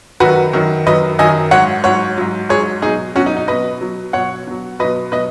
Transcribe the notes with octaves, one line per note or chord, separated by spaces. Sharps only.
F#2 D#3 F#3 F#4 B4
F#2 D#3 F#3
F#2 D#3 F#3 B4 D#5
F#2 D#3 F#3 D#5 G#5
G#2 F#3 C#5 F#5
G#2 F#3 C#5 F#5
G#2 F#3
G#2 F#3 G#4 C#5
B2 F#3 D#4 G#4
B2 F#3 C#4 F#4
D#4
D#4
B2 F#3 B4 D#5
B2 F#3
B2 F#3 C#5 F#5
B2 F#3
B2 F#3 B4 D#5
B2 F#3 B4 D#5